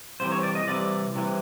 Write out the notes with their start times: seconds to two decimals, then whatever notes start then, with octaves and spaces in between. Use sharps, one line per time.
0.20 C2 C3 E3 C5
0.32 C#5
0.43 D5
0.55 D#5
0.67 C2 C3 E3 D5
1.14 C2 C3 E3